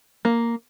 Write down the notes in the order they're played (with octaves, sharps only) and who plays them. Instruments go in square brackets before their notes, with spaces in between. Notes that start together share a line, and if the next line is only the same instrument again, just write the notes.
[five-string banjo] A#3